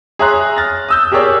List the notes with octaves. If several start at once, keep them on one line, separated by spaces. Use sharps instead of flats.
G#4 C#5 E5 A#5 C6 F#6
F6 A6 A#6
D#6 E6 G6
G4 G#4 A#4 C#5 D5